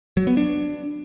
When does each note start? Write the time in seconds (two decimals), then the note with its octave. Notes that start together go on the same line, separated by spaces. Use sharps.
0.17 F#3
0.27 B3
0.37 D4